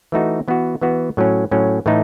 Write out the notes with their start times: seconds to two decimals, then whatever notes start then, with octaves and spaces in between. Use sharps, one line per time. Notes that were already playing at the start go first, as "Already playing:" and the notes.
0.12 E3 A3 D#4 F#4
0.48 E3 B3 F#4
0.81 E3 B3 F#4
1.17 A2 F#3 C#4
1.51 A2 F#3 C#4
1.86 A2 E3 A3 D#4